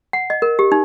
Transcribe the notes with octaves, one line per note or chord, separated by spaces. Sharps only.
F#5
D#5
A#4
G4
D#4